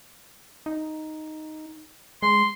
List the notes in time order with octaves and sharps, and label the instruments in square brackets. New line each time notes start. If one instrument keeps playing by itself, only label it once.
[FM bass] D#4
[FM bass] G#3 [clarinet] C6